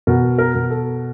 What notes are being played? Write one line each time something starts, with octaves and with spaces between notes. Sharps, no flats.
B2 A#4
A#4
B2
A4